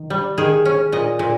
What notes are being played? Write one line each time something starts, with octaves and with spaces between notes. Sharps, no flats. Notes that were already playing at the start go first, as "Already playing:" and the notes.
Already playing: D#3
G3
D#3 G#4
C#4
A#2 D#5
A#2